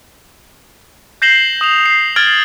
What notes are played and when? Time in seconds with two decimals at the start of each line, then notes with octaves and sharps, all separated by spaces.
1.22 G6 A#6 C7 E7 F#7 G7
1.61 D#6 E7 F7
1.86 C7
2.16 F6 G#6 A6 D7 F#7 G7